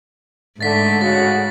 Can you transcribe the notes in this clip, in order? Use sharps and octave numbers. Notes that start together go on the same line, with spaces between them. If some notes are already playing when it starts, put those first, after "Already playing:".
G#2 D3 A3 A6 B6
C#3 F#4 A6